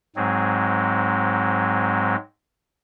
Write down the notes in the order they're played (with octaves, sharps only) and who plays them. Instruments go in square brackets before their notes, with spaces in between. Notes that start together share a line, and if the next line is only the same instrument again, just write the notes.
[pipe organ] G#2 F#3 G#3 C4